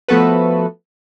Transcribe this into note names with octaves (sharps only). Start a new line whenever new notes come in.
F3 A3 B3 F#4 A4 B4